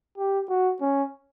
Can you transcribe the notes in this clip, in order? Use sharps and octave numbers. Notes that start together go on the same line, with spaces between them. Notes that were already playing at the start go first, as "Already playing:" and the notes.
G4
F#4
C#4